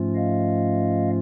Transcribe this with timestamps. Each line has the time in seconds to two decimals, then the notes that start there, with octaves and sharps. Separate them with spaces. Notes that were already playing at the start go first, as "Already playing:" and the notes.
Already playing: G#2 F3 A3 C#4 F4
0.15 D#5 F5